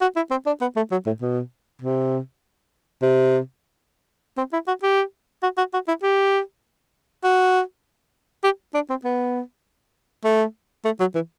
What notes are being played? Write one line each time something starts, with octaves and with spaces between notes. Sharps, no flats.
F#4
E4
C4
D4
B3
A3
F#3
A2
B2
C3
C3
C4
E4
F#4
G4
F#4
F#4
F#4
E4
G4
F#4
G4
D4
C4
B3
A3
A3
F#3
E3